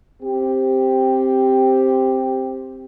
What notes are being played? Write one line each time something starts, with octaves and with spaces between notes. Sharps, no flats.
C4 G4